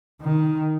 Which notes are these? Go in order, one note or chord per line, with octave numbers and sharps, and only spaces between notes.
D#3